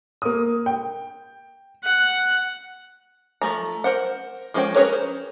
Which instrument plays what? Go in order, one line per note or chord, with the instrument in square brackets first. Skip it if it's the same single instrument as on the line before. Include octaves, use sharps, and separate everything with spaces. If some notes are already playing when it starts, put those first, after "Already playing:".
[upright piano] A#3 D#6
G5
[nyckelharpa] F#5
[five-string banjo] F3 A3 A#5
A#4 C5 F#5
F3 G#3 C#4 C5 G5
C#4 G#4 A#4 B4 C#5
C5